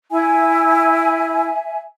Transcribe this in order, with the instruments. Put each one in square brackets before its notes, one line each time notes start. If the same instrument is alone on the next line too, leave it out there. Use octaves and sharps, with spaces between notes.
[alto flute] E4 [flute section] E5 G#5